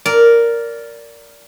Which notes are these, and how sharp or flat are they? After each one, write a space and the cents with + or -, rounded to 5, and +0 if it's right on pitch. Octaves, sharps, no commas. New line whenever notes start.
A#4 +0 D5 -15